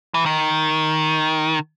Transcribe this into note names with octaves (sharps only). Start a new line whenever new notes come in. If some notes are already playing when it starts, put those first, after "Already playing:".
E3
D#3